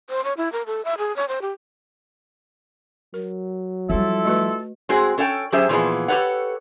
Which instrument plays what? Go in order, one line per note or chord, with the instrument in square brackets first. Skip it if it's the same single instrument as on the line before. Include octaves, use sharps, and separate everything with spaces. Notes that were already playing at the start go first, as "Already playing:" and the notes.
[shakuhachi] C5
C#5
E4
A#4
A4
E5
G#4
C#5
C5
G4
[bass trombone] F#3 [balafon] A#4
[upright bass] F3 G3 [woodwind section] E4 F4 A4
[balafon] A3 F#4 B4
[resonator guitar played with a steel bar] G#3 C4 F#4 G#4
C#4 A4 C#5 F#5 G5
F#3 C#4 G4 G#4 C5 E5
A#2 E3 F3 B3 G#4
G4 A4 B4 C#5 F#5